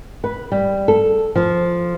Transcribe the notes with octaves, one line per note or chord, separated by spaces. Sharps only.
B4
G3
A4
F3